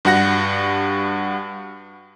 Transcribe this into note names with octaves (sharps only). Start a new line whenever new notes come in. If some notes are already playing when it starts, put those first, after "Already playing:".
G2 G3 F#4 F#5 A#6